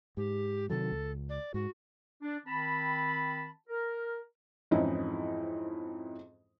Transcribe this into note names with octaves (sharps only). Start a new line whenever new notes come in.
G#2 G4
C3 D#3 F#3 A4
C#2
D5
G#2 F#4
D4
D#3 C4 A5 B5
A#4
F2 G#2 E3 C#4 D#4 E4